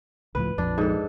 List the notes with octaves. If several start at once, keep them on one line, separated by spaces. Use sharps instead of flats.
C#2 A2 F3 B4
A#1 F2 D4
G#2 A4